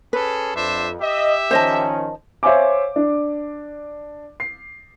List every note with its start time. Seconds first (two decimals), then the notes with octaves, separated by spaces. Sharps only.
0.13 C#4 G#4 A4 B4
0.55 F2 D4 C5 E5
1.01 G4 D#5 E5
1.51 D#3 F3 C#4 C5 D#5 A5
2.43 C5 C#5 E5 F5 G#5 D6
2.96 D4
4.40 C7